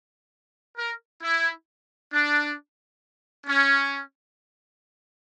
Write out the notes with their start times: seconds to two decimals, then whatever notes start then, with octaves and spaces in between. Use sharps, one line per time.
0.77 A#4
1.23 E4
2.12 D4
3.46 C#4